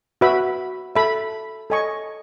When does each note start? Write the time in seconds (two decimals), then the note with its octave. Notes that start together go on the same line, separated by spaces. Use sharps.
0.21 F#4 B4 E5 B5
0.96 A4 E5 B5
1.70 A4 D#5 G#5 C#6